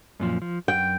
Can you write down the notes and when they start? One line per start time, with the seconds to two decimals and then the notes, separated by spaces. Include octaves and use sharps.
0.20 F#2 A#2 F3
0.42 F3
0.68 F#2 G5